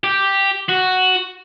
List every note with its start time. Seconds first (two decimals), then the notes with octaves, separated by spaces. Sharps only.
0.04 G4
0.69 F#4